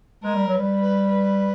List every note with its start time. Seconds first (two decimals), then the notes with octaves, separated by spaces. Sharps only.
0.24 G#3 A#4
0.35 G3
0.47 F#3
0.53 B4
0.59 G3
0.80 B4
1.09 B4